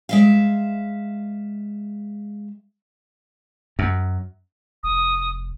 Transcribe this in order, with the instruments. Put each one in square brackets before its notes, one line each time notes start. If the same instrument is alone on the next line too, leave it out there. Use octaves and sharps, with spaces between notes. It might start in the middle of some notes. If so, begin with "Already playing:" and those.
[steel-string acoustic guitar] G#3 E5 F5
[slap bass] F#2
[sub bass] F1 [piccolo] D#6